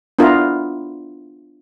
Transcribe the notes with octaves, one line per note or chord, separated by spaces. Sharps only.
B3 D4 E4 F4 A#4